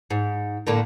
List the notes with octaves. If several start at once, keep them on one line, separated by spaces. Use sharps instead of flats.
G#2
A2 D3 A#3